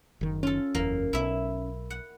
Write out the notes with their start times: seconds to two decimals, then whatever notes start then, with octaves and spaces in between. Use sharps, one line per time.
0.21 F#1 D#3
0.43 C#4 F4 A4
0.75 F#1 E2 A#3
1.13 B1 E4 E5
1.90 F#5